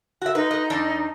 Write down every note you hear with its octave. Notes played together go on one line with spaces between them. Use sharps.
F#4 E5
D#4 B4
B4 D#5
E2 D4 D5